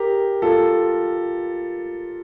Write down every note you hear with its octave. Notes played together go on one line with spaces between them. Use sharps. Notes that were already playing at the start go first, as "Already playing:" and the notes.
Already playing: G4 A#4
F4 A4